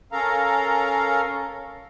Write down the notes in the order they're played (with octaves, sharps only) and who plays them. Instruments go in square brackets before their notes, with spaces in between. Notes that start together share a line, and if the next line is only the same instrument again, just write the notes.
[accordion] C#4 A4 A#4 F5 A#5